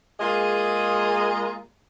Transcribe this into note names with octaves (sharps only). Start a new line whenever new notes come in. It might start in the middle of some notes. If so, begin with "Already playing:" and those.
G#3 A#3 F4 G#4 D#5